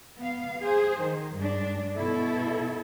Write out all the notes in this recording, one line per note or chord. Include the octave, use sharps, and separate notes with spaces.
B3 F5
G#4 C5
D#3
G2 G#3 D4
B2 E4 A4